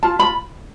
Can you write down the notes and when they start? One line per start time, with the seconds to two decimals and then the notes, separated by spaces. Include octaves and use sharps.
0.03 F4 A5
0.19 F4 B5